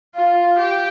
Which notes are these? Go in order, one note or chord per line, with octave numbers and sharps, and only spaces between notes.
F4
G4